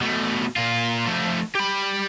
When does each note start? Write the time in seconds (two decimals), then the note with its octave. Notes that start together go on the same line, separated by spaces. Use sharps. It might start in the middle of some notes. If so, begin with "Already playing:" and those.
0.01 B2 A3
0.56 A#2 F4
1.06 F2 A3
1.55 G4 B5